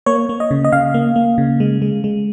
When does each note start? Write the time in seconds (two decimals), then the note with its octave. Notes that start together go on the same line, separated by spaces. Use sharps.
0.06 A#3 C#5
0.29 A#3
0.40 D#5
0.51 C#3
0.65 D#5
0.72 C#3 F5
0.94 A#3
1.16 A#3
1.38 C#3
1.60 G#3
1.82 G#3
2.04 G#3